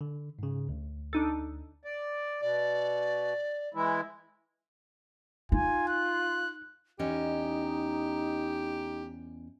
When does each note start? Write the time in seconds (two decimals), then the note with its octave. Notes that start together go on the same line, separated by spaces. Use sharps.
0.01 D3
0.39 G#2 C#3
0.69 D2
1.13 D4 D#4 A4
1.85 D5
2.42 B2 D5
3.74 E3 G#3 E4
5.52 D#4 F4 G#5
5.88 F#6
6.99 E2 C#4 D#4 G4 D#5